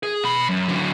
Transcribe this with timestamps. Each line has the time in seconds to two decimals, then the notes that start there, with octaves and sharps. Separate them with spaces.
0.03 G#4
0.24 B2 B5
0.49 F#2
0.68 D3 F#3